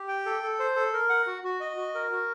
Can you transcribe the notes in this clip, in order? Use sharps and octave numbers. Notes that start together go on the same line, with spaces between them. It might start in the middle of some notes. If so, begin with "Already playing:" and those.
Already playing: G4
G5
A4
A4
C5
A4
A#4
F#5
F#4
F#4
D#5
F#4
A#4
F#4